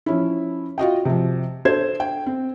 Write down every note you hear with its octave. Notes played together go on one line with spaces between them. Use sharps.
F3 C#4 E4
F4 F#4 D#5 G5
C3 F3
D4 A4 C5 G#6
G5
C4